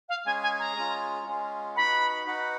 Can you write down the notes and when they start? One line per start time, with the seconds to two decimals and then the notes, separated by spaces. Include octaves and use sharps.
0.08 F5
0.25 G#3 C#4 G#4 G#5
0.42 G#5
0.59 A#5
0.76 G#3 C#4 F4
1.26 G#3 C#4 F4
1.75 D#4 F#4 B4 F#5 B5
2.27 D#4 F#4 B4 F#5